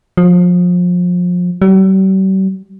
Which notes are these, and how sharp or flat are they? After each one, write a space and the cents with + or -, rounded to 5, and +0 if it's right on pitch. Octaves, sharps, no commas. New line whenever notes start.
F3 +30
G3 -45